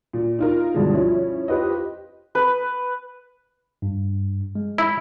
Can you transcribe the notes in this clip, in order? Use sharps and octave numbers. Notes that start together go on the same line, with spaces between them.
A#2
D#4 F4 A#4
D2 G2 B2 F3 G#3
F3 C#4 E4
F4 G4 B4 C5 D#5
B4
G2
G#3
E4